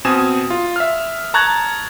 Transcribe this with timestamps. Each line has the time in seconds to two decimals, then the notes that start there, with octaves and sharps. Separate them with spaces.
0.05 B2 C4 G#5 D#6 E7
0.50 F4
0.76 E5 F6
1.34 A5 A#5 C#6 F#6 G#6 A6